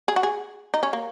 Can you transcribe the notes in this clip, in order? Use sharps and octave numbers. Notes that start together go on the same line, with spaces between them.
G#4
F#4
G#4
D#4
C#4
A#3